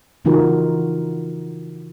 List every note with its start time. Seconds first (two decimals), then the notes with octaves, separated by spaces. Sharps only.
0.25 C#3 E3 D#4 F4 F#4 A#4